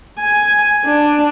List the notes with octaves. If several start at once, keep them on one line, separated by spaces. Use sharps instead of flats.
G#5
D4